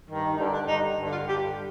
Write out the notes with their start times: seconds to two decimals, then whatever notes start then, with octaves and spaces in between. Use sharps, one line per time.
0.08 G2 D#3
0.37 G2 D3 D#4
0.53 D4
0.67 G2 D3 D#4
0.97 G2 D3
1.13 F4
1.27 G2 D3 G4